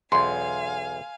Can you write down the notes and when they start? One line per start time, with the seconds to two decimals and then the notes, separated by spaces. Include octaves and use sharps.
0.12 B1 E2 F5 G#5 C6